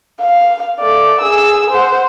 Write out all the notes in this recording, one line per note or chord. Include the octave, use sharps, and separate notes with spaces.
F5
A3 D5
G#4 E6
C5 F#5